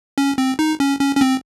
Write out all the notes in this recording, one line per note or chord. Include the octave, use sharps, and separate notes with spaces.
C#4
C4
D#4
C#4
C#4
C#4
C4